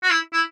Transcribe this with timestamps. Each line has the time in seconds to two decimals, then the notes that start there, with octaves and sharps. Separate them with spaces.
0.03 F#4
0.10 E4
0.33 E4